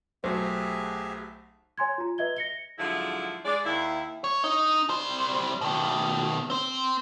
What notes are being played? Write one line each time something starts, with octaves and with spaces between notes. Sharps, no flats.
B1 F#3 A3 G4 G#4 C5 E5
C#5 G#5 C6 G#6
F4 A#5
B4 D#5 E5 G#6 G7
A#6 C#7 G7
G#2 D3 F3 F#3 E4
G#3 D5
D#2 E4
C#5
D#4
G3 C5
B2 D#3
C4 C5